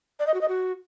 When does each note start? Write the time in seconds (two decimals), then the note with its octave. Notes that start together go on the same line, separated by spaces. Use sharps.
0.20 D5
0.27 D#5
0.34 F#4
0.41 D#5
0.48 F#4